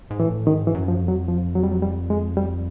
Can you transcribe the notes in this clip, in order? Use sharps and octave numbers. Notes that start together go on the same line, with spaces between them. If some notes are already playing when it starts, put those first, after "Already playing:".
G#2
A2 E3
G#2 D#3
E3
F#2
F3
F2
F#3
F3
F#3
G3
F#3
G3
G#3
G3